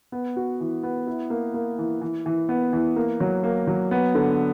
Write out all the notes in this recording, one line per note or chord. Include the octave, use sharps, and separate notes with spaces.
B3
F#4
E3
B3
E4
A#3
A#3
E3
E3
E3
B3
E3
A#3
F#3
A#3
F#3
B3
D3